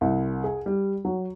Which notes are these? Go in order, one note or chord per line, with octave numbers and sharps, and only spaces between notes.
C2
G#4
G3
F#3